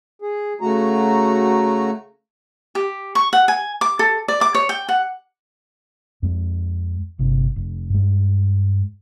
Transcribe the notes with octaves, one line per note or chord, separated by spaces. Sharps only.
G#4
C#3 A3 F#4 A#5
G4
C#6
F#5
G#5
D6
A4
D5
D6
C#5
G5
F#5
F2 G#3
G1 C3
F1
G2 G#3